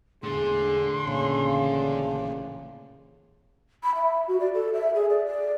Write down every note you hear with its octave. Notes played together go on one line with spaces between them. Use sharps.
E1 A2 D3 G#4 C6
A1 A#2 C#3 A#3
B5
E5
F#4
D5
A4
E5
G#4
D5
D5